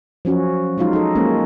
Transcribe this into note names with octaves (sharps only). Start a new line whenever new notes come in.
F3 F#3 C#4 F#4
F#3 G#3 D#4 F4
D#4 A4
F#3 G#3 A#3 C#4